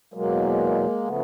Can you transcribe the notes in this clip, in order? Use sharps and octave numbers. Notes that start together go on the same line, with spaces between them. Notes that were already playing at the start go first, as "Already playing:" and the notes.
E2 B2 F#3 G#3 A#3
C#3 F3 A3 B3